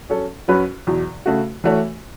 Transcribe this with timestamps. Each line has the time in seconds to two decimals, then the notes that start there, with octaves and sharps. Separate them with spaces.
0.10 F#3 C#4 A4
0.48 F#2 F#3 C#4 F#4 B4
0.87 E2 B2 F#3
1.26 C#3 A3 F#4
1.64 E3 A3 F#4 C#5